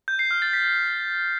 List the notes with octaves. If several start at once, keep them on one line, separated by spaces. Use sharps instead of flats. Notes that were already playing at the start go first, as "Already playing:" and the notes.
G6
C7
F6
A6
B6